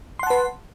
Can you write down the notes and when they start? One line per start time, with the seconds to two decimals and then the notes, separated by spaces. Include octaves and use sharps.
0.19 C6
0.23 F#5
0.27 A5
0.30 B4